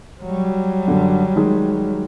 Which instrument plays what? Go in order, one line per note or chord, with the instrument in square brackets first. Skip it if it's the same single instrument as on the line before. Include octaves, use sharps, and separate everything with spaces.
[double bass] F#3 G3
[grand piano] F#2 D3
D#3 G#3